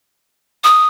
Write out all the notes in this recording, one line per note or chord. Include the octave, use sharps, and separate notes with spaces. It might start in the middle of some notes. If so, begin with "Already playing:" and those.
D#6